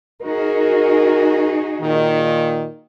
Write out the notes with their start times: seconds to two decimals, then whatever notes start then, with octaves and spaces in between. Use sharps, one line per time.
0.22 D#4 F#4 G#4 A#4
1.82 A#2 D#3